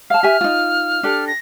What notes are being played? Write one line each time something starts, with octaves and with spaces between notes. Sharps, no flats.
F5 A5 F6
G4 E5 G#5
D#4 F4
D4 G4 A4
A#6